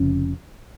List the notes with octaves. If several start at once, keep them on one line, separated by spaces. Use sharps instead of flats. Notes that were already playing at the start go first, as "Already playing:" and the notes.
Already playing: F1 F2 C#3 C#4